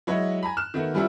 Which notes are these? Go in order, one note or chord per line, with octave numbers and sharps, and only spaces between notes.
F#3 G#3 E4 F#4 C#5 D#5
G#5 A#5 B5
F6 F#6 E7
D#3 A3 B3 F#4
E3 G3 C#4 F4 F#4 E5